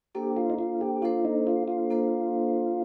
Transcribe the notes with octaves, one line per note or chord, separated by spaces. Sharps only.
A#3 D4 G4 A4 C5
F4
D#4
F4
G4
A#3 D4 F4 A4 C5
D#4
F4
F4
A#3 D4 A4 C5